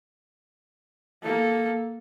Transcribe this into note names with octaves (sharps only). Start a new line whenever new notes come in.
A#3 A4